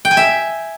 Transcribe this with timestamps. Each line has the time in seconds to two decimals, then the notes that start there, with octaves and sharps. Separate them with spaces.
0.05 G5
0.11 G#5
0.17 E5